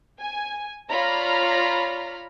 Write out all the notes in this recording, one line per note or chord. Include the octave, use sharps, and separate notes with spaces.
G#5
F4 C#5 D5 A#5 B5 F6